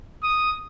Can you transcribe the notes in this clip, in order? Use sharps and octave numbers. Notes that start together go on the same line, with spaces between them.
D#6